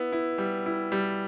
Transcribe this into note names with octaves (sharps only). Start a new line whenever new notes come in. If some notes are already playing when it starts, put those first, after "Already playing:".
Already playing: B3 E4
E4
G3
E4
G3